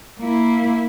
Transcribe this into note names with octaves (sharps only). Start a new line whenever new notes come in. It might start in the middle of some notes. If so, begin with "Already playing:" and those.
A#3 E4